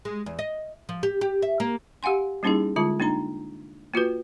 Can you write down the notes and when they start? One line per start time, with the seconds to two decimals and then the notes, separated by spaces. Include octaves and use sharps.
0.05 G#3
0.26 E2
0.39 D#5
0.89 F3
1.03 G4
1.21 G4
1.42 E5
1.60 A#3
2.03 G4 F5 F#5 G#5 C6
2.43 G3 A#3 C#4 D#4 E4 G#4
2.76 D3 G#3 F4 A5
3.00 A#3 D4 D#4 A#5
3.94 A#3 F4 F#4 B4